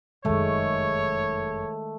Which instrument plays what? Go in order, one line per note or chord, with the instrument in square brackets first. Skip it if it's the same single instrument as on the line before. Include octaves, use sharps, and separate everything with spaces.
[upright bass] F1 F#2 [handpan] D#3 G#3 [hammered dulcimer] A3 [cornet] C#5